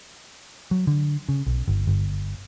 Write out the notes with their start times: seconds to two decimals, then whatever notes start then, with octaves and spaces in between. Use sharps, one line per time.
0.71 F#3
0.87 D3
1.29 C#3
1.46 B1
1.68 G1
1.87 G1